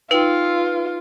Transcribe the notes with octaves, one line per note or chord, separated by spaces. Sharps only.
D#4 F4 B4 G5